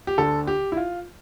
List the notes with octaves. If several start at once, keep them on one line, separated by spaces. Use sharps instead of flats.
G4
D2 D3 A4
G4
E4
F4